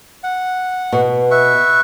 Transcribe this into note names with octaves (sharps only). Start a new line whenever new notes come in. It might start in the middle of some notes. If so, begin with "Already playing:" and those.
F#5
B2
B4 E5 C#6